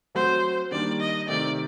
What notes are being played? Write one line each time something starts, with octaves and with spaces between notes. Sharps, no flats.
F#3 A3 C4 F#4 C5
D#3 G3 A#3 D4 D5
D#5
C3 D#3 A3 D5